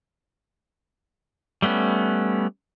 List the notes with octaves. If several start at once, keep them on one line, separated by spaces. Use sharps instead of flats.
G3 A3 B3 C#4